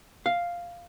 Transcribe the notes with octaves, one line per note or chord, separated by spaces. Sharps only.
F5